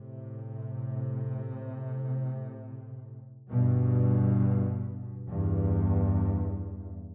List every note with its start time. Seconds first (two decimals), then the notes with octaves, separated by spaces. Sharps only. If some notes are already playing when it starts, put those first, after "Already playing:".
Already playing: A2 C3
3.50 G2 B2
5.27 E2 G2